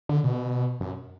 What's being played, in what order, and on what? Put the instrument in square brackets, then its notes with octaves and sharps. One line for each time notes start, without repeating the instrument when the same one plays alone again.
[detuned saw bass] D3
B2
F#2